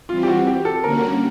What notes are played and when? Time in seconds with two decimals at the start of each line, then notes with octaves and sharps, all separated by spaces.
0.09 E3 G3 C4 F4
0.23 G4
0.28 F#4
0.47 G4
0.65 A4
0.84 D3 G3 A#3 C#4 F#4 A#4